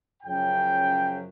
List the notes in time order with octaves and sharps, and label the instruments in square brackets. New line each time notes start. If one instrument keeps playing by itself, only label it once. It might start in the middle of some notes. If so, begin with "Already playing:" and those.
[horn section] F#2 C#3 F3 G5